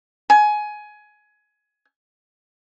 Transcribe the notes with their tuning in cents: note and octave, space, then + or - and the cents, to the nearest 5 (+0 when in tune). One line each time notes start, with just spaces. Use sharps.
G#5 +20